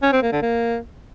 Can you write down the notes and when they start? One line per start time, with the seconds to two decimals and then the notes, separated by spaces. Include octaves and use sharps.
0.02 C#4
0.12 C4
0.22 A#3
0.32 D3
0.42 A#3